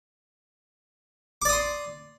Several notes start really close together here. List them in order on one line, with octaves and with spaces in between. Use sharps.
D6 D5 D#6 C6